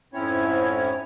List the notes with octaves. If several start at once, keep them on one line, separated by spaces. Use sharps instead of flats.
F2 G#2 C4 C#4 E4 C#5